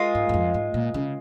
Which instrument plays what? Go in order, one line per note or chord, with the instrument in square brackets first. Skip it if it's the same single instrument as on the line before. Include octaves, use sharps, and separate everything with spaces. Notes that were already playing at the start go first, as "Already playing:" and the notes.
Already playing: [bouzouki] G#3 F4 A#4
[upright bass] G#2
G#2
F2
G#2
A#2
C#3